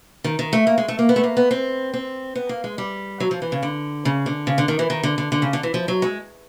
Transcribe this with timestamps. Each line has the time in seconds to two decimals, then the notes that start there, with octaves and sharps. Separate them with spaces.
0.24 D#3
0.39 D#3
0.53 A3
0.67 A#3
0.78 G#3
0.88 A3
0.99 A#3
1.09 B3
1.16 A3
1.24 A#3
1.37 B3
1.51 C4
1.94 C4
2.36 B3
2.49 A#3
2.64 G#3
2.78 G3
3.20 F#3
3.31 F3
3.42 E3
3.52 C#3
3.63 D3
4.05 C#3
4.26 D3
4.47 C#3
4.58 D3
4.68 D#3
4.79 E3
4.90 D#3
5.03 D3
5.18 D3
5.32 D3
5.42 C#3
5.53 D3
5.63 E3
5.74 F3
5.88 F#3
6.02 G#3